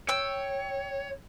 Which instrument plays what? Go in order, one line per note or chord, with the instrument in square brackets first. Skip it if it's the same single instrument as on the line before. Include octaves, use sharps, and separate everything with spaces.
[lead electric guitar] C#5 [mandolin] G5 E6